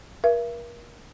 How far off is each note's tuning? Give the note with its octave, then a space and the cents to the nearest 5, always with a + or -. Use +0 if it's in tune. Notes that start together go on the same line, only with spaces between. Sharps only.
A#4 +35 E5 +40